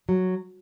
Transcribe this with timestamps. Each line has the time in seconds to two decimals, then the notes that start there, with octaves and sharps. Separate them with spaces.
0.09 F#3